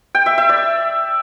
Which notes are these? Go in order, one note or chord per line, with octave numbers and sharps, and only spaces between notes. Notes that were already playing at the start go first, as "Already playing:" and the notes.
G5
E5
E5
D5